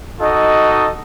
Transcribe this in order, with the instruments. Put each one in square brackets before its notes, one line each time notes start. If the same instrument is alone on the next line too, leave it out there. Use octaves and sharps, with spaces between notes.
[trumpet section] D#4 F#4 A4 D#5